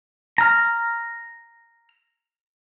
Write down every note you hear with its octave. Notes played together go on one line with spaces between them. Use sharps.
A#5 F6